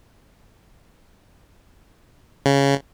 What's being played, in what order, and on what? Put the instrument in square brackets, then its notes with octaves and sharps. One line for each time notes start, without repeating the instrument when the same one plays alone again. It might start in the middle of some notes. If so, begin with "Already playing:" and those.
[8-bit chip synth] C#3